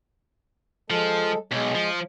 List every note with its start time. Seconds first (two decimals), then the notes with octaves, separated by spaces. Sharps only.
0.90 F3 G#3 A4
1.52 B1 G#3
1.75 F3